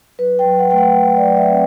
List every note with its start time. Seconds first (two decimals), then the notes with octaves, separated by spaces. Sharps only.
0.19 F#3 B4
0.39 G5
0.45 F#3
0.59 F#5
0.71 A3 G5
0.78 F#5
0.98 F#3
1.17 D5
1.24 F#3
1.37 E5
1.50 C4